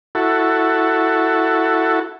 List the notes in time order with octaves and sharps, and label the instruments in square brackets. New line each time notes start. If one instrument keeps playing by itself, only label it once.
[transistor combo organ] E4 F#4 A4